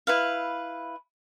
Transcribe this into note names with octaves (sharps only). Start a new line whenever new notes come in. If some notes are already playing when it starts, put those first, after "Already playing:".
E4 B4 F5